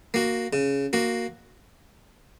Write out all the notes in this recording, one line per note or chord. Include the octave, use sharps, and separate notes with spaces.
A#3 F#4
C#3
A#3 F#4